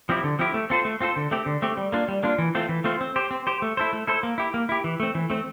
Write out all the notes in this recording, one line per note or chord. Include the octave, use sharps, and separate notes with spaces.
F3 C4 E4 G4
D3
F3 C4 E4 G4
A3
C4 F4 A4 C5
A3
C4 F4 A4 C5
D3
A3 C4 G4
D3
A3 C4 G4
G3
A#3 D4 F4
G3
A#3 D4 F4
E3
A3 C4 F4 C5
E3
A3 C4 F4 C5
C4
G4 C5
C4
G4 C5
A3
E4 A4 C5
A3
E4 A4 C5
A#3
E4 G4
A#3
E4 G4
E3
A3 C4
E3
A3 C4